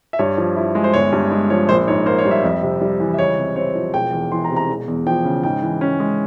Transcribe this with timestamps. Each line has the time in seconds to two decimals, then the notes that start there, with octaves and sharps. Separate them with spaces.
0.13 E5
0.19 G2 C#5
0.38 F3
0.56 E4
0.75 G#3
0.84 C5
0.94 G1 C#5
1.12 G2
1.31 G#3
1.50 F3 C#5
1.69 A#1 C5
1.87 G#2 C#5
2.06 A#3 C5
2.18 C#5
2.25 G3
2.31 E5
2.43 F2
2.63 C3
2.81 G3
3.00 E3
3.14 E5
3.19 C#2 C#5
3.38 C3
3.56 C4 C#5
3.75 F3
3.94 E1 G5
4.13 E2
4.32 E3 C6
4.44 A#5
4.51 C3
4.56 A#5
4.69 E1
4.88 E2
5.06 F3 G5
5.25 C#3
5.43 G#2 G5
5.63 E3
5.81 C#4
6.00 G#3